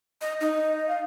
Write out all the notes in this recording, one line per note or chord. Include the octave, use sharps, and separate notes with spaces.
D#5
D#4 D#5
F5